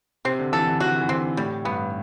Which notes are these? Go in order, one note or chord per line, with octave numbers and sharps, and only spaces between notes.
C3 C4
D3
E3 A4
D3
E3 F#4
E3
D3 C4
A2 G3
G2 B3